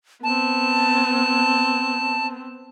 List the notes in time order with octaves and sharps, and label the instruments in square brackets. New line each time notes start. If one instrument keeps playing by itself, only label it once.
[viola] B3 C4 [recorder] A5